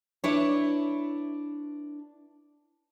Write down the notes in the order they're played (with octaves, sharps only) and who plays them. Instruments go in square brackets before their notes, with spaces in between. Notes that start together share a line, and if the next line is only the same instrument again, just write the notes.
[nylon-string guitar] D4 E4 B4 C#5